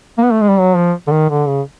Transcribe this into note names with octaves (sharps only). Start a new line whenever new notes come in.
A#3
B3
A3
G#3
G3
F#3
F3
D3
D#3
D3
C#3